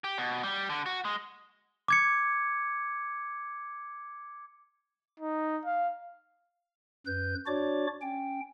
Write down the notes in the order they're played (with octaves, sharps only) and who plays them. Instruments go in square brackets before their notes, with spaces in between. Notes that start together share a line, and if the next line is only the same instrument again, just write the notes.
[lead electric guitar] G4
B2
G3
D3
F#4
G#3
[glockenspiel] D6 G#6 C#7
[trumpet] D#4
F5
[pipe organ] F#2 B4 G6
D4 F#4 C#5 D5 D6
C#4 G5